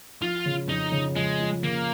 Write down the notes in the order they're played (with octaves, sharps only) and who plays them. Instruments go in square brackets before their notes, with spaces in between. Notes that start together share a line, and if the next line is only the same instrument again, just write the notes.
[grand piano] F3 [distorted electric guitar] F4
[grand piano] C#3
[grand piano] F2 [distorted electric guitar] D#4
[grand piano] C#3
[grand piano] F2 [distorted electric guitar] G#3
[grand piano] F3
[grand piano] C#3 [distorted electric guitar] A#3